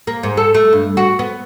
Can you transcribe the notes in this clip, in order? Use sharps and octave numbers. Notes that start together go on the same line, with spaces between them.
A#3
G#2
A4
A3
G2
F#4
B3